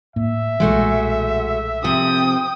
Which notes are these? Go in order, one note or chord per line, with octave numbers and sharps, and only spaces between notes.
A2 A#3 E5
B1 A#2 E3 G#3 A3 F#4
C3 F3 C4 G5 D#6